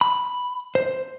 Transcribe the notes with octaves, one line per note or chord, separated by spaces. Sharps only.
B5
C5